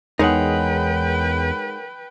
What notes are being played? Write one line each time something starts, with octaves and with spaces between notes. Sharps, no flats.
E2 G#3 D#4 A#4 B4 C#5 F#5 G5